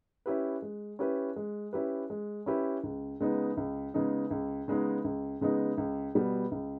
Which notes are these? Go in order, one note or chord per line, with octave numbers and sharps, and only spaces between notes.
C#4 E4 G4 B4
G#3
C#4 E4 G4 B4
G#3
C#4 E4 G4 B4
G#3
C#4 E4 G4 B4
C#2
C#3 G#3 B3 D#4
C#2
C#3 G#3 B3 D#4
C#2
C#3 G#3 B3 D#4
C#2
C#3 G#3 B3 D#4
C#2
B2 G3 B3
C#2